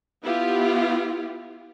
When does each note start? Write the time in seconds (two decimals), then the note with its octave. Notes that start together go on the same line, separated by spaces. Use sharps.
0.23 B3 E4 F4 G4